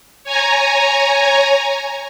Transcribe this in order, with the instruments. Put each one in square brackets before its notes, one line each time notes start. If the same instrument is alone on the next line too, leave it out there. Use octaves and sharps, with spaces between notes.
[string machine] C#5 G#5 A#5